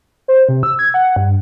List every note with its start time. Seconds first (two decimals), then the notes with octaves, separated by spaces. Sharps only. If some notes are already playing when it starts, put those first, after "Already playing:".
0.28 C5
0.49 C3
0.63 E6
0.79 G#6
0.94 F#5
1.16 G2